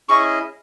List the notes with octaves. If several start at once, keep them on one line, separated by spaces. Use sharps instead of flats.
C#4 E4 G#4 D#5 C#6